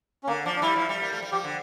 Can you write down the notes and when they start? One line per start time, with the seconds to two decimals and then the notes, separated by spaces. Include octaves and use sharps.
0.23 C#4
0.27 D3 A#3
0.45 F3 D4
0.56 D4
0.62 G3 E4
0.76 F3
0.89 G3
1.02 A#3
1.13 A3
1.22 G3
1.32 F3 G4
1.44 D3